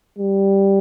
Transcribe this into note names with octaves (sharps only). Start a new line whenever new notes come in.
G3